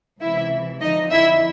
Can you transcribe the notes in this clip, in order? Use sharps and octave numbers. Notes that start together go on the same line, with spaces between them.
C#2 C3 E3 E4 E5
F2 D3 F3 D#4 D#5
E4 E5